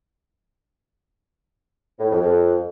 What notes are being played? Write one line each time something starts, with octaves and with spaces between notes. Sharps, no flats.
A2
F2
F2